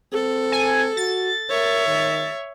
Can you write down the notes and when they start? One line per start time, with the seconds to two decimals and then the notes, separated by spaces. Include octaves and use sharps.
0.13 C4 A4
0.52 G#5
0.97 F#4 A6
1.50 A#4 C#5 E5
1.87 D#3